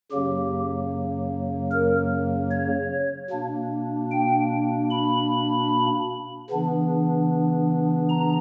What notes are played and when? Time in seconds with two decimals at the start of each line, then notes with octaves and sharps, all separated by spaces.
0.12 F#2 C#3 F#3 A#3 G4
1.71 A#4
2.51 C#5
3.30 B2 A#3 D4
4.11 G5
4.90 B5
6.50 C#3 E3 B3 D4
8.09 A#5